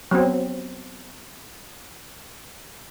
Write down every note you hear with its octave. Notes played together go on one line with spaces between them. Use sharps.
F#3 B3 C4